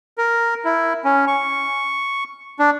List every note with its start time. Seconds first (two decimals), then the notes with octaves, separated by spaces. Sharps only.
0.18 A#4
0.65 E4
1.04 C#4
1.28 C#6
2.59 D4